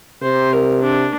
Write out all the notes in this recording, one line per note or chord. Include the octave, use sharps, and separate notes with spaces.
C3 C5
A#4
D4